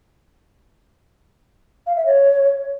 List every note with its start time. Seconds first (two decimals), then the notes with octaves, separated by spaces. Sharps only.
1.86 F5
1.96 E5
2.05 C#5